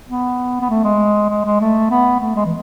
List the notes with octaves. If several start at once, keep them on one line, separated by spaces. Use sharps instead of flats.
B3
B3
A3
G#3
G#3
G#3
A3
B3
A3
G#3
E3